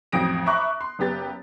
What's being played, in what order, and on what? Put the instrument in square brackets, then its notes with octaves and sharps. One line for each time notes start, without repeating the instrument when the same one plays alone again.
[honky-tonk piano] A1 F2 F#3 D#6 A#6 D7
E5 A#5 B5 C#6 D6 F#6
C6
F#1 B3 G4 A6